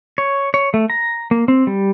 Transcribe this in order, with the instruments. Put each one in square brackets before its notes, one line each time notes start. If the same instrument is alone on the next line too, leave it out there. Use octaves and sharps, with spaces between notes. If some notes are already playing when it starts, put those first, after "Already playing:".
[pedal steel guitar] C#5
C#5
A3
A#5
A#3
C4
G3